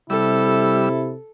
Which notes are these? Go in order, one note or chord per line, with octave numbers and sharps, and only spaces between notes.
C3 G3 E4 A4 E6